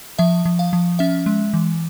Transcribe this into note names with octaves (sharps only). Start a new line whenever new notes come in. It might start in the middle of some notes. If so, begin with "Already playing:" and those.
F3 E5
F3
F5
F3
C#4 E5
G#3
E3